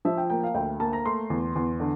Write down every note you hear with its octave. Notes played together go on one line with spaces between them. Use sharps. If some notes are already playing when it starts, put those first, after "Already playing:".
F3 E5
G5
A#3 G5
F5
D2 G5
A#3 A5
A#5
A3 C6
E2
E2
D3